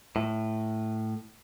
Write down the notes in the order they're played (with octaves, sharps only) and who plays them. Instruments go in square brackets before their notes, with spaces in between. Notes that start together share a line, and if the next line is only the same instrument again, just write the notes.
[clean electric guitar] A2